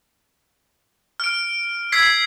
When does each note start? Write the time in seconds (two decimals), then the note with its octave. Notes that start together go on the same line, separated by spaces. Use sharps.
1.20 F6 D7
1.92 E6 G#6 B6 C7